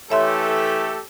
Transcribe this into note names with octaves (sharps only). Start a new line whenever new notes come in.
E3 A3 G4 A4 C#5 E5 C6